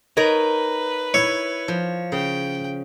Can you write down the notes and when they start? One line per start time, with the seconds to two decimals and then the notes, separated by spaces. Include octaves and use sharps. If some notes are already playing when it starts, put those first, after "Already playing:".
0.17 D#4 A#4 B4 C#5
1.14 E4 C#5
1.68 F3
2.12 C#3 G5